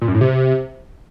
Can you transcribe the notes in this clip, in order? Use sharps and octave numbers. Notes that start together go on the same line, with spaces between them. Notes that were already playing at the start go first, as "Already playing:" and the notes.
A#2
F#2
A2
C3